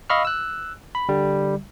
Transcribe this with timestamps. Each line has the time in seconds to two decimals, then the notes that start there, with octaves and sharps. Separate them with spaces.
0.10 D#5 F5 B5 C#6 E6 F6
0.25 E6 F#6
0.95 B5
1.09 D3 G3